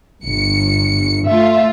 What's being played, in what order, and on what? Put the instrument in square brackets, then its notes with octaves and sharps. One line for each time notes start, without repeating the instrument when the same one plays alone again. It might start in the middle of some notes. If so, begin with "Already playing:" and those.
[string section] G1 C#7
[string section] A3 F4 [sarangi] E5